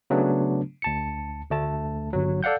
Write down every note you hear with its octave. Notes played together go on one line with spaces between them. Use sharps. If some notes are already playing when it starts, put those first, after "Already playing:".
C#3 F#3 A3 B3 D4
D2 A5 C#7
D2 A3 A5
G1 F#3
A4 D5 F5 F#5 G6